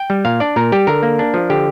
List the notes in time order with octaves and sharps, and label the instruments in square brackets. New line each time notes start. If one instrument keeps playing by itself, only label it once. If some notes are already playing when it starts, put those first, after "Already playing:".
Already playing: [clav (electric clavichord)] G5
G3
A#2 F5
D4 D5
A#2 A#4
G3 G4
D3 A#4
A#3
D4
F3
D3 G4